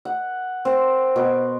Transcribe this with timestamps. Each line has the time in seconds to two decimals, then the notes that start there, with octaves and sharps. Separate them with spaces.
0.05 F#5
0.65 C4
1.16 B2